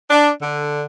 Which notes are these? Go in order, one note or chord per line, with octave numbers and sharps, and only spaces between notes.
D4
D3